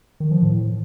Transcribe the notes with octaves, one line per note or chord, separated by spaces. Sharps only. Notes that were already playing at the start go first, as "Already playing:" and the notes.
D#3
F3
A2